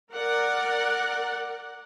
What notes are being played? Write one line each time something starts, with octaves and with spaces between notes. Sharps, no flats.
A#4 D5 F#5